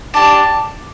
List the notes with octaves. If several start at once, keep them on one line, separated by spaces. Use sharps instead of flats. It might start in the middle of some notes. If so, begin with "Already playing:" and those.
D4 G4 D5 A5